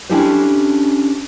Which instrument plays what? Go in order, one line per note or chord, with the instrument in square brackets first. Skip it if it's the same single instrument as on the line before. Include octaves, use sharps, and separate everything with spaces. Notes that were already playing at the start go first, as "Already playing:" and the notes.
[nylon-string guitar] C#4 D4 E4 G4 A4 C5